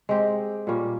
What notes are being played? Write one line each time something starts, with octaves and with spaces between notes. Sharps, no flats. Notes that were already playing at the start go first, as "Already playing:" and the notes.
G#3 C4 G4
A#2 G3 A#3 C#4